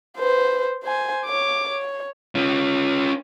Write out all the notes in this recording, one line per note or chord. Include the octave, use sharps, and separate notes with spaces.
B4 C5
C5 G#5
C#5 D6
C#5
C#4 F4